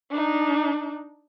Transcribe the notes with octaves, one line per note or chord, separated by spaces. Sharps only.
D4 D#4